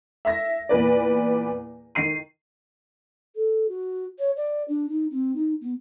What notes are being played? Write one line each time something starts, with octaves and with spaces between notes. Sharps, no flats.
E5 A#6
E2 A#2 B4 D5
D#3 C7 D#7
A4
F#4
C#5
D5
D4
D#4
C4
D#4
B3